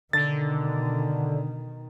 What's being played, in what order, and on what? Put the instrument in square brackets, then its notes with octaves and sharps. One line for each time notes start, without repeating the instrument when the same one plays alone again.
[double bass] B2 D#3 [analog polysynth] D3 [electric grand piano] A6